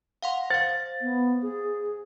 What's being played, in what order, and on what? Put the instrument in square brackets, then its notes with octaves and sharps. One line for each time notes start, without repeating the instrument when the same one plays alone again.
[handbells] F5 F#5 C6
[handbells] C5 F5 [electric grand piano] A6
[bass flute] B3
G#4